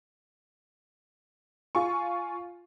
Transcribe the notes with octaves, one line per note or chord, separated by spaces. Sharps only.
F4 G#5 C#6